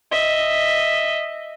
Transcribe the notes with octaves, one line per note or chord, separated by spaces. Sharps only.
D#5 E5